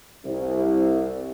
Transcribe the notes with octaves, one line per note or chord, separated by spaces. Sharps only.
C2